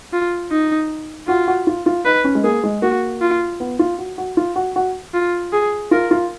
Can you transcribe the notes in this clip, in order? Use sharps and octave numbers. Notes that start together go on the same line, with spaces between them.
F4
D#4
F4 F#4
F#4
F4
F4
D#4 B4
C#4
G#3
A#3 G#4
G#3
A#3 F#4
F4
B3
F4
F#4
F#4
F4
F#4
F#4
F4
G#4
F4 A#4
F4